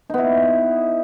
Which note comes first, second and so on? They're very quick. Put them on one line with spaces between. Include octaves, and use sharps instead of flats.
D#4 B3 E4